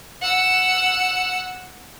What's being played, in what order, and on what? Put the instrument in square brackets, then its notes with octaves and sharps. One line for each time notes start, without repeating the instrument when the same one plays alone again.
[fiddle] F#5 E6